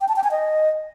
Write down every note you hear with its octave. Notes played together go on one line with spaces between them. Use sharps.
G5
A5
G5
G#5
D#5